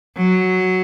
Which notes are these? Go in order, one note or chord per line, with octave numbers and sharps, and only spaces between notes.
F#3